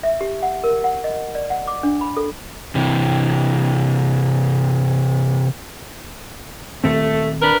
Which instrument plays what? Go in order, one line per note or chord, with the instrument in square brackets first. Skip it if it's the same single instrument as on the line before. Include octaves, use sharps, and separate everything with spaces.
[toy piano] E5
G4
F#5
A#4
F#5
D#5
D5
F#5
D6
D4
B5
A4
[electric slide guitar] C3 E3
[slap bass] D#1 D#3 C4 [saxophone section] A3
[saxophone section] D4 A#4 B4